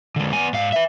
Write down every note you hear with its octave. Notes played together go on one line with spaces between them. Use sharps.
D3 G#3
B3 G#5
G#2 F5
B4 E5